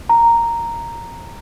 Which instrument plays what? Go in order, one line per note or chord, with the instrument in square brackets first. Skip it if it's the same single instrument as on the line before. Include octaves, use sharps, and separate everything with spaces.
[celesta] A#5